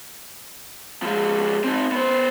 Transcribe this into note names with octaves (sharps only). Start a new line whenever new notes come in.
F3 G#3
C4 D#4
B3 C5